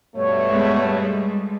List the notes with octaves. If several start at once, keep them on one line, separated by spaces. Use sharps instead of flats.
G2 B2 A3 C#5
G#3 B3
G3 G#3